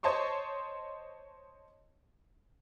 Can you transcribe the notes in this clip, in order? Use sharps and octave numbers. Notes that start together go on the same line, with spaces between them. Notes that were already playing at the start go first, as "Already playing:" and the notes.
C5 C#5 D#5 A5 C6 C#6